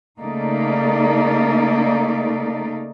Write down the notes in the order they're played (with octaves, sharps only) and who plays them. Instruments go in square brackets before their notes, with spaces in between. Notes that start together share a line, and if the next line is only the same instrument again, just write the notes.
[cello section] C#3 A3 A#3 D#4 D5